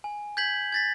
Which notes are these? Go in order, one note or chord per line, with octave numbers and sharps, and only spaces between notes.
G#5
G6 G#6 B6 F#7
G#6 A6 B6